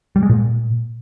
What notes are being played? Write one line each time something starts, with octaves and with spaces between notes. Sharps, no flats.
G3
G#3
A#2